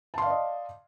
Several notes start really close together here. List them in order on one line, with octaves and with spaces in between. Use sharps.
A5 C6 F5 D5 D#5